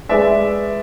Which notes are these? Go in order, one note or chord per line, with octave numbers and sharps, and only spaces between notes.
G#3 G#4 B4 D5 E5